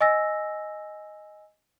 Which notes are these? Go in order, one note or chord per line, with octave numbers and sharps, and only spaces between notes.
D#5 G#5 E6 A#6